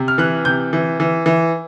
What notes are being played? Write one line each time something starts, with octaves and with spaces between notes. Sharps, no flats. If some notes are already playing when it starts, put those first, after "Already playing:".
Already playing: C3
F6
E3 F#6
C3 G6
E3
E3
E3